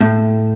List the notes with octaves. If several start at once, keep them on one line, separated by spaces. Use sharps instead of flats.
A2